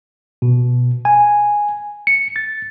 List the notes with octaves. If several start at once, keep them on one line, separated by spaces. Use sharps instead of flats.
B2
G#5
C#7
A6